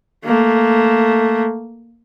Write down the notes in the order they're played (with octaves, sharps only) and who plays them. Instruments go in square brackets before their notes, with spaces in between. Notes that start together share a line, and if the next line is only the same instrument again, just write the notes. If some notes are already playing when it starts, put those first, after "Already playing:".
[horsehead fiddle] A3 A#3